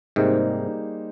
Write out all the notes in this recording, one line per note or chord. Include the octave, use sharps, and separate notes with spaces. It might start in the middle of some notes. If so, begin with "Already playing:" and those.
G#2 C3 G3 A#3 D#4 G#4 C5